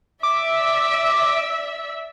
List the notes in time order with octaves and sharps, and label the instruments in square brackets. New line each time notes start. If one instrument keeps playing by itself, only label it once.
[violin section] D5 E5 [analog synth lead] D6